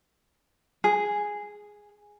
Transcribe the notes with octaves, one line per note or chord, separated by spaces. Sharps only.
G#4